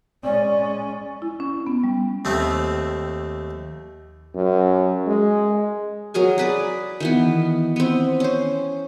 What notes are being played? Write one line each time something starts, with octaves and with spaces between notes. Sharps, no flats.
G#3 C#4 D5
E4
C#4
B3
G3
D#2 A3 C4
F#2
G#3
F#3 G#4 A#4 G#5
G#4 B4 D5
D#3 E3 B3
B3 C4
C#4 C5